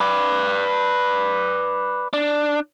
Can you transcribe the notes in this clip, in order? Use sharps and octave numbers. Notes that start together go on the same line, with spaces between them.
B4 D5
D4